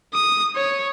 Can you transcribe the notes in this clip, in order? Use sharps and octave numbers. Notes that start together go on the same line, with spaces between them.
D#6
C#5